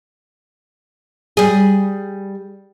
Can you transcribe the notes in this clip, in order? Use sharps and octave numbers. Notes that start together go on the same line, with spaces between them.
G3 G#4